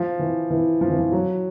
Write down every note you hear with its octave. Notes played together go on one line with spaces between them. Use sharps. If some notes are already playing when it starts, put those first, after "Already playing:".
Already playing: F3
E3
E3
F3
E3
F3
F#3